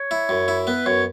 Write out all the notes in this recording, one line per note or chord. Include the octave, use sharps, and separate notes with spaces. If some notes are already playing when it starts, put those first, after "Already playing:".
Already playing: C#5
E4
F#2
E4
B3 B4
F#2 C#5